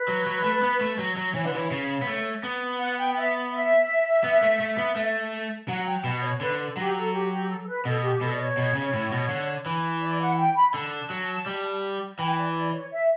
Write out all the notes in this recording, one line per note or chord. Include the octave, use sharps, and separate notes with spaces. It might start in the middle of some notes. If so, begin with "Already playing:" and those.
Already playing: B4
F#3
F#3
A3
B3
A3
F#3
F#3
E3 C#5
D3 B4
E3 C#5
C#3
B3
A3
B3
F#5
G5
E5
E5
B3
A3
A3
B3
A3
F#3 F#5
G5
B2 F#5
C#5
D3 B4
A4
F#3 G4
A4
G4
G4
A4
A4
B4
B2 A4
G4
B2 A4
D5
C#5
B2
C#3
A2
B2
D3
E3
D5
F#5
G5
B5
B5
D3 A5
F#3
G3
E3 G5
D5
D5
C#5
E5